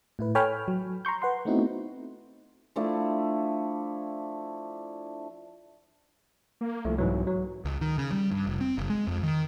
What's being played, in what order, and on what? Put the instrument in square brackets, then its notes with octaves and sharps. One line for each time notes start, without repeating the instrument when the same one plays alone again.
[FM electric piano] A2 E4 B4
A4 C#5 G5 G#5 B5 F6
F#3
A#5 C6 C#6 G6
B4 F#5 C6
A3 B3 C4 D#4 E4 F#4
[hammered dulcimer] F3 A3 D4 E4
[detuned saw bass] A#3
[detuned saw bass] C2 [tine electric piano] F3 A3
[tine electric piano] G#2 E3 F#3
F#3
[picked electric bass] C#2
D#3
C#3
G3
G2
F1
C4
F#1
G#3
F2
D#3